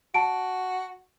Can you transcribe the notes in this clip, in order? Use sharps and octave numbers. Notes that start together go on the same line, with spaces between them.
F#4 A5 D7